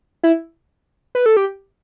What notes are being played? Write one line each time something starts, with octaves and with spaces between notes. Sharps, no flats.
E4
B4
A4
G4